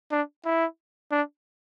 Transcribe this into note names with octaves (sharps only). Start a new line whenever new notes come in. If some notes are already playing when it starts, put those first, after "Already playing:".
D4
E4
D4